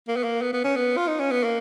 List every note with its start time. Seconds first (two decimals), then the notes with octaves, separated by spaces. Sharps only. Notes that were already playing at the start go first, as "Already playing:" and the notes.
0.08 A#3
0.16 B3
0.24 A#3
0.42 B3
0.53 B3
0.64 C#4
0.76 B3
0.97 F4
1.08 D#4
1.20 C#4
1.31 B3
1.44 A#3